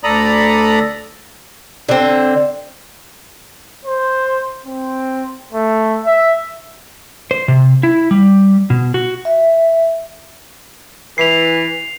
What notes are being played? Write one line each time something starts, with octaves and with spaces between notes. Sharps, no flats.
D2 A4 D5 A#5 B5 D#6
D3 C4
C5
C4
A3
E5
C5
C3
E4
G3
B2
F#4
E5
E3 C7 F7